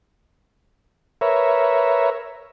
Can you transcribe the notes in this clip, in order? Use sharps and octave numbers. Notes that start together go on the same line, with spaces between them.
A#4 B4 C#5 E5